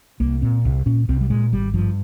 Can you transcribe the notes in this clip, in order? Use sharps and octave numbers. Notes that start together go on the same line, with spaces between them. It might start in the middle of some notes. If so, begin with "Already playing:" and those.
C2 A#3
A#2 C4
C2
A#2 C#4
C2 C4
G3
A#2 G#3
G#1 G3
G2 F3